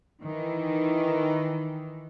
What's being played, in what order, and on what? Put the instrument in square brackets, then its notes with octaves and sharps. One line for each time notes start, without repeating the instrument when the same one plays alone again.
[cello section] D#3 E3